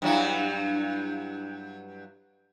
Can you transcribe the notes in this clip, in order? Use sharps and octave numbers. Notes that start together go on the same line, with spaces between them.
G2 F#3 E4